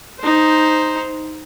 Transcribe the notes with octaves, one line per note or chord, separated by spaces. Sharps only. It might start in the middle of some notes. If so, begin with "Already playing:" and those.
D#4 C5